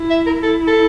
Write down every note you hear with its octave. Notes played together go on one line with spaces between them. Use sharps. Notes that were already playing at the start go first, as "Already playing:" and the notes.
Already playing: E4
E5
A#4
E4 A4
A4